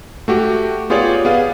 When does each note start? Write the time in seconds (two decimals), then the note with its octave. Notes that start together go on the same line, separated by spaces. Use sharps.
0.28 A3 F#4 G4
0.90 B3 F4 G4 G#4 C#5 D5
1.25 B3 G#4 F5